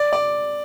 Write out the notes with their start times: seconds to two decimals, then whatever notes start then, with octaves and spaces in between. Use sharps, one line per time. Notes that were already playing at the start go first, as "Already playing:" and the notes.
Already playing: D5
0.13 D5